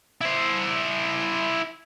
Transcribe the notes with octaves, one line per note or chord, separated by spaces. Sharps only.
E4 C5